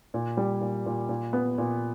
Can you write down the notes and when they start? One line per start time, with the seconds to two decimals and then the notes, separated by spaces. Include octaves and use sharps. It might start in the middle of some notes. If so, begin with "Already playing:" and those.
0.14 A#2
0.37 G3
0.61 A#2
0.86 A#2
1.09 A#2
1.33 B3
1.58 A#2